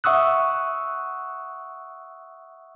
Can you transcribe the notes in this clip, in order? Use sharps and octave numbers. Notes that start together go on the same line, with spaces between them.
E5 F#5 C#6 D#6 E6 F#6